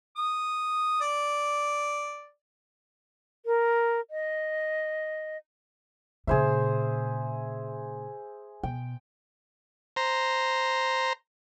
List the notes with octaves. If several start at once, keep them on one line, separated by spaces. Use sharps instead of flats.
D#6
D5
A#4
D#5
A#2 C#3 G#4 C5 E5
B2 G5
C5 A#5